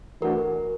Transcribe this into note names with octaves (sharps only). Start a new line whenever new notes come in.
E3 A3 D4 F#4 A#4